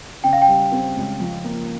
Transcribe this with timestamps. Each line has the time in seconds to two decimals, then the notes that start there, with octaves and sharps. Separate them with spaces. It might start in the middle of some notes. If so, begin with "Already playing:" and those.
0.24 C#3 G5
0.33 F5
0.42 G5
0.48 G3
0.72 C4
0.96 C#2
1.20 F3
1.44 A#3